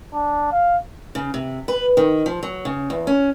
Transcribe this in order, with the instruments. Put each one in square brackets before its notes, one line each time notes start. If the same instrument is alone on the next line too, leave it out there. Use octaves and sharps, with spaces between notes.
[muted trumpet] D4
F5
[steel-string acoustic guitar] C#3
C3
B4
D#3
F3
F#3
C#3
E2
C#4